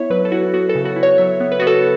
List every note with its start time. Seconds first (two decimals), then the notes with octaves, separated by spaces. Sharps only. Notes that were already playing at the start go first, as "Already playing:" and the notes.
Already playing: B3 E4 C#5 E5
0.10 F#3 B4
0.25 A4
0.32 E4 F#4
0.54 B3 F#4
0.69 A4
0.75 C#3
0.85 F#4
0.96 E4
1.03 C#5
1.18 F#3 E5
1.40 B3
1.52 B4
1.60 B3 F#4
1.67 A4